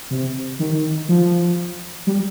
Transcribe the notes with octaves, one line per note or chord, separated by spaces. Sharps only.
C3
D#3
F3
G3